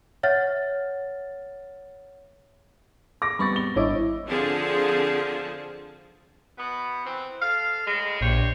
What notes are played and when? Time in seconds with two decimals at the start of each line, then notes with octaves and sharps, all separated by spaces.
0.23 C#5 E5 F#5 F6 A6
3.22 D6 A#6
3.39 G3 B3 C4 B5 C#6 A6
3.53 A#6 G7
3.76 G#1 D4 E4 C#5 D#5 D6
4.27 D3 F3 C4 G#4 A5
6.57 B2 B3
7.05 E3 C4
7.41 A4 F5
7.86 A2 G#3
8.21 A#1 G4 C5 C#5